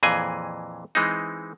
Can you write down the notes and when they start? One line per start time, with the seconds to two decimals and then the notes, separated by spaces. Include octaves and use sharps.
0.03 F2 A#2 E3 G#4 D#5 G#5
0.95 E3 G#3 C4 D#4